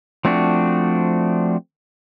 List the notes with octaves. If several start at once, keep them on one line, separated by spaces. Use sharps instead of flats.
F3 A3 C4 D4 F#4